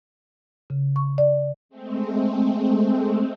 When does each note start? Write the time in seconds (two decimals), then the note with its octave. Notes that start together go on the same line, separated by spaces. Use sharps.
0.70 C#3
0.96 C#6
1.18 D5
1.69 G#3 A3 C4